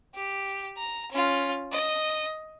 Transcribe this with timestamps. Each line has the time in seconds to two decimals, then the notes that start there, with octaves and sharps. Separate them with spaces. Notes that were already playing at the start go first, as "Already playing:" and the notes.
0.15 G4
0.77 A#5
1.12 C#4 F4
1.72 D#5